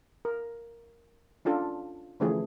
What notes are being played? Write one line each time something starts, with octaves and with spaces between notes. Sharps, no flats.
A#4
C#4 D4 F4 A4
D3 E3 F3 A3 C#4 G#4